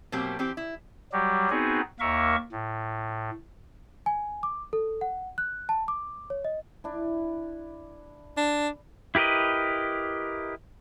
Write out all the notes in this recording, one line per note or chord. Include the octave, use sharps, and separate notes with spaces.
B2 F#3 A#3 C4 G4
E3 C4 G4
E4
F#3 G3 F#4 G4
B3 C4 D#4 F#4 G#4
D#2 A#3 A#4 E5 C#6
A2
G#5
D6
A4
F#5
F#6
A5
D6
C#5
D#5
D4 E4
D4
E4 G4 A#4 B4 D#5